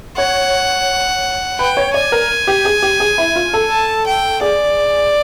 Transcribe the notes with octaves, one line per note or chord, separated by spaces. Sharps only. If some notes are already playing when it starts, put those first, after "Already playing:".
C#5 F#5
B4 G5
C#5
D5 G#5
A#4
G4
G#4
G4
G#4
E4
F4
A4
A5
G5
G#4 D5